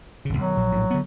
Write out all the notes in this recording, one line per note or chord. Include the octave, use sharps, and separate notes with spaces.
G1 C#3
B1 D#3 F#3
A#1
A#1 A2
D3 B3